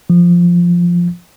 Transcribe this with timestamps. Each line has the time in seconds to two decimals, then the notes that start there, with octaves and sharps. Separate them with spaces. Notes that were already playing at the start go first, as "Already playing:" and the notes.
0.10 F3